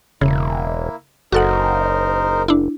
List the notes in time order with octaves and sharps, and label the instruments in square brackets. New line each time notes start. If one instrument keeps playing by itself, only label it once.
[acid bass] E1 [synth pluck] C#3 [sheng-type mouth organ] A#3 E4
[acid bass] F#1 [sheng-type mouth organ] D#4 A#4 C5 [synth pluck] F#4 A4 F#5
[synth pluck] D4 E4